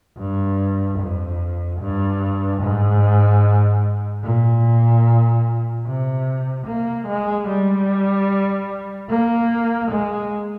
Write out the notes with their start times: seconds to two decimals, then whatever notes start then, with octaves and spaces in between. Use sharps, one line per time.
0.17 G2
0.99 F2
1.80 G2
2.61 G#2
4.23 A#2
5.85 C3
6.66 A#3
7.07 G#3
7.47 G3
9.09 A#3
9.91 G#3